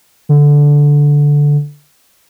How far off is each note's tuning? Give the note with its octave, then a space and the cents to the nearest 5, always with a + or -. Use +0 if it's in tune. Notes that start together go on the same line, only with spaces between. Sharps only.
D3 -10